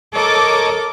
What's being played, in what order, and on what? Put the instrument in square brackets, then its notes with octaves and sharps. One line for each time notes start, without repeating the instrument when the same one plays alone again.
[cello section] A4 [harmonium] A#4 [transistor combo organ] C#5 D#5 [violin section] D6